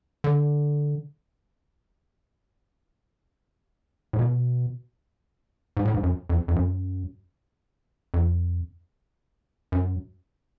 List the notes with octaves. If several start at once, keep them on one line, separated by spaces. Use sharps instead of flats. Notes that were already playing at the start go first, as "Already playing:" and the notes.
D3
A2
B2
G#2
A2
G#2
F#2
F2
F2
F#2
F2
F#2